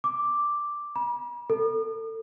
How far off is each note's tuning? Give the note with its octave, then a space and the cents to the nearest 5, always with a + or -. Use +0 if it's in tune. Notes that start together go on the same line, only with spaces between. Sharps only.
D6 +0
B5 -45
A4 +30